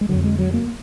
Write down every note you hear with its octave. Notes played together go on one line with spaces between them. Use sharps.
G#3
F2 D3 F#3
G#3
F#3
A#3